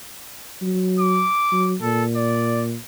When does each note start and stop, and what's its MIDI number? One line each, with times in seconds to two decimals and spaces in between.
0.62 1.25 54
0.99 1.72 86
1.52 1.75 54
1.82 2.76 46
1.82 2.04 69
2.16 2.65 74